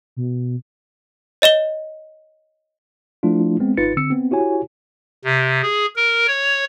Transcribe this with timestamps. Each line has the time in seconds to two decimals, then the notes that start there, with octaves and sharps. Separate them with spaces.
0.17 B2
1.42 C#5 D#5 E7 G7
3.23 F3 A3 D4 E4 F4
3.60 G#3 B3 C4
3.77 G#1 D#4 F4 B4 A6 C#7
3.97 D3 C4 E6 C#7
4.10 B3 C4
4.31 E4 F#4 G4 C#5 G#5
5.25 C3
5.63 G#4
5.96 A#4
6.27 C#5